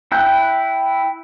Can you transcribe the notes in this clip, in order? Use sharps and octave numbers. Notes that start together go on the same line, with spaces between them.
E4 G5 F#6 G6